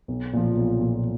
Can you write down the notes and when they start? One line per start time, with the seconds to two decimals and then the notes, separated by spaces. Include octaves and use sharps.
0.08 B1
0.33 A#2 F3
0.57 B1
0.80 A#2 F3